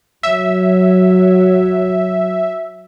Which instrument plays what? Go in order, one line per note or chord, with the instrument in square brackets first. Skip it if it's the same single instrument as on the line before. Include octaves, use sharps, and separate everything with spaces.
[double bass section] F#3 [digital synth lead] E5